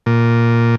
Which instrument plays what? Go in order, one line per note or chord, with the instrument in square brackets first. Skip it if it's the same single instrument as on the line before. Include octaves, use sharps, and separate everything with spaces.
[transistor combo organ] A#2